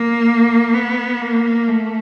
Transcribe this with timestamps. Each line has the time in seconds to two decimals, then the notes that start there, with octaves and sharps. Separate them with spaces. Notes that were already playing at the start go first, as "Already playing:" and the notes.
Already playing: A#3
0.74 B3
1.21 A#3
1.68 A3